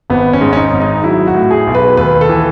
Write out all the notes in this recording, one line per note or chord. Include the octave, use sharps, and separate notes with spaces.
G#1 B3
C#4
G#2
C#4
D#4
G#1
D#4
F#3 E4
F#4
A2
G#4
B1
B4
D#2 B4
A4
E3